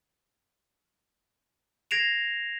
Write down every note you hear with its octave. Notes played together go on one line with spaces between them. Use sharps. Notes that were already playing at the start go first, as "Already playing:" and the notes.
G#6 A#6 C7 D7 E7 F7